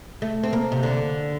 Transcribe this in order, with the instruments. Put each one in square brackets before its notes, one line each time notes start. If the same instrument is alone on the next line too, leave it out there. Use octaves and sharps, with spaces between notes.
[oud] A3
C4
A#3
C3
D3